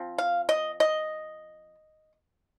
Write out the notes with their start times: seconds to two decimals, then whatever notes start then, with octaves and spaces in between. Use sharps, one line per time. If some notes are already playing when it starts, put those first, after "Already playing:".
Already playing: F3 C4
0.18 F5
0.49 D#5
0.80 D#5